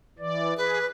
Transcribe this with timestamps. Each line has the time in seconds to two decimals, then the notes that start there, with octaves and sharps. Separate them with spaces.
0.19 E3 D5
0.57 G#4 B4